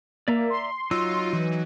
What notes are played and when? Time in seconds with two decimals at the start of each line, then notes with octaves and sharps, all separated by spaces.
0.28 A#3 D5 E5 A#5
0.50 C6
0.91 F#3 D#4 F4 E6
1.33 E3